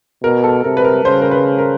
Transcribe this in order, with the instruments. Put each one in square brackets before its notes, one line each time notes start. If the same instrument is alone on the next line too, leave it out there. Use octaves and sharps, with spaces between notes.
[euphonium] B2 [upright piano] A#4
[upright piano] A4
[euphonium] C3 [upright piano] A#4
[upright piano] B4
A#4
[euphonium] C#3 [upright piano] C5
[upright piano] A#4
B4
A#4